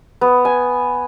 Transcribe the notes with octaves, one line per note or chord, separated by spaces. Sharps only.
B3
G#5